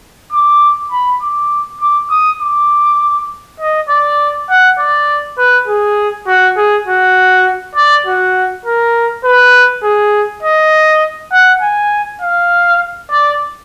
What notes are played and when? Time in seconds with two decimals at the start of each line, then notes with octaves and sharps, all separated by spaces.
0.33 D6
0.92 B5
1.22 D6
1.81 D6
2.11 D#6
2.41 D6
3.60 D#5
3.89 D5
4.49 F#5
4.79 D5
5.38 B4
5.67 G#4
6.27 F#4
6.57 G#4
6.87 F#4
7.75 D5
8.06 F#4
8.66 A#4
9.24 B4
9.84 G#4
10.43 D#5
11.32 F#5
11.62 G#5
12.22 F5
13.11 D5